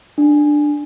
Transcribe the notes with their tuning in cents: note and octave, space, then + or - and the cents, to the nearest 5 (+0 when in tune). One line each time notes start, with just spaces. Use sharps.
D4 +10